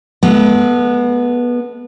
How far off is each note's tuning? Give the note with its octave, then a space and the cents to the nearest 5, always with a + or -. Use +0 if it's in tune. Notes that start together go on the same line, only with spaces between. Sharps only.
G#3 +40 B3 -20 A4 +0